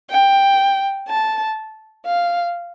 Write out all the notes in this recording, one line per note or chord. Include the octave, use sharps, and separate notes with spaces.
G5
A5
F5